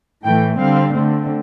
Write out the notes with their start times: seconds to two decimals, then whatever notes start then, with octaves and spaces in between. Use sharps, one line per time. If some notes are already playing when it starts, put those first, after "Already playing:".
0.24 A2 E3 A3 G5
0.59 D3 G3 C4 F5
0.94 D3 A3 C4